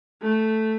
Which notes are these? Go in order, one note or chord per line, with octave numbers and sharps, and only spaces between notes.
A3